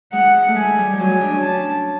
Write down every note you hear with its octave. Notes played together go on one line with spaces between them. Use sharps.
G#3 F#5
A3
G#3 G#5
G3
F3
F#3 G#5
G#3
D4
C#4
A5